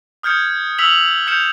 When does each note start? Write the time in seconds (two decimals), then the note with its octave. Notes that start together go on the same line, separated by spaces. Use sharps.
0.23 D#6 F6 G6 G#6 C#7
0.78 E6 F6 B6 F7 F#7
1.27 F6 G6 C#7 E7 F7